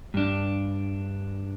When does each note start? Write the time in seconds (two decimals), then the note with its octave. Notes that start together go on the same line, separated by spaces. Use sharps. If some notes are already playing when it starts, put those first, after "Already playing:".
0.14 G2 D4